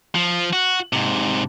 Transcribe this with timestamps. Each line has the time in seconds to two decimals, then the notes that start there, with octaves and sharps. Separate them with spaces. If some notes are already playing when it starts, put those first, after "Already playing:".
0.15 F3
0.53 F#4
0.93 G#2 C3